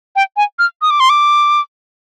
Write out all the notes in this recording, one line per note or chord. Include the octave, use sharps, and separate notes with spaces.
G5
G#5
F6
D#6
D6
C6
D6